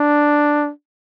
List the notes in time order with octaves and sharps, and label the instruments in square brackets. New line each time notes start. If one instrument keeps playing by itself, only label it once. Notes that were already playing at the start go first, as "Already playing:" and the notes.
Already playing: [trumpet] D4